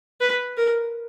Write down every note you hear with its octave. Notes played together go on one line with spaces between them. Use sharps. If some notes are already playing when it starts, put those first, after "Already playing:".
B4
A#4